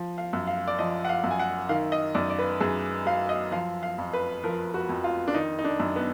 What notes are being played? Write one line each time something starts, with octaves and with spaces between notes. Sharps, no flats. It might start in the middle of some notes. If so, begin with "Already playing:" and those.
Already playing: F3
F5
F#2
F5
D5
F3 D#5
F#5
F5
F#2
G#5
F#5
D#3 F5
D#5
F#2 D5
D5
B4
F#2 G#4
F#3 F5
D#5
F3 F5
F5
F2
B4
F3 A#4
F#4
F2
F4
D4
D#3 D#4
D#4
D4
F#2
B3